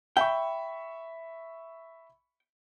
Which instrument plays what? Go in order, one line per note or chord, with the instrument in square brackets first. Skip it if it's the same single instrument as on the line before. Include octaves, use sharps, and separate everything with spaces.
[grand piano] E5 B5 C#6 [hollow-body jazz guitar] G5